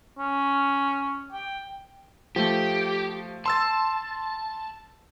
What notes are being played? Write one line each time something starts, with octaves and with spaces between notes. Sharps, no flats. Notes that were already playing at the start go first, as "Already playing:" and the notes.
C#4
G5
F3 A3 G4
A5 C6 E6 A6